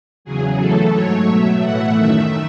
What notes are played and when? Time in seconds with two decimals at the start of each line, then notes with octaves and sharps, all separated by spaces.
0.25 E2 C#3 F#3 G#4
0.59 F#2 E3 A3 A4
0.93 G#2 F#3 A3 C#5
1.27 B2 F#3 A3 E5
1.61 A2 E3 A3 F#5
1.95 F#2 D#3 A3 E5